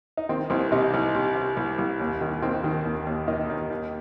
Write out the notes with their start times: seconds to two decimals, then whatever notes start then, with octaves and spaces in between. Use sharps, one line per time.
0.17 D#4
0.29 D#3 C4
0.50 C2 C4
0.72 C3 D#4
0.94 C2
1.15 C3
1.35 C3
1.57 C2
1.78 C2
2.00 D#2
2.21 D#3
2.42 D#3 C4
2.64 D#3
2.85 D#2
3.07 D#2
3.28 D#3 D#4
3.50 D#2
3.71 D#2